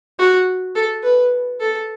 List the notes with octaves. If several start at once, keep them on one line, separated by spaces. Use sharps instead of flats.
F#4
A4
B4
A4